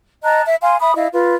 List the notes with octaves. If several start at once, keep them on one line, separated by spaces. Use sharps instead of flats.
D#5 A5 A#5 F#6
E5
F5 G#5 C6
E5 B5 D#6
E4 D#5 F5
F4 B4